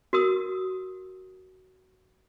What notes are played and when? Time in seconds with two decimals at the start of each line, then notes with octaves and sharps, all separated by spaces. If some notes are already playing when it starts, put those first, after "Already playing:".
0.13 F#4 A#4 D#6